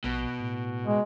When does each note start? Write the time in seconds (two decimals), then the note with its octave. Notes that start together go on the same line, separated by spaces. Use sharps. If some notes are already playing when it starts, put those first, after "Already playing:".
0.04 A#1 B2
0.40 A2
0.87 G#3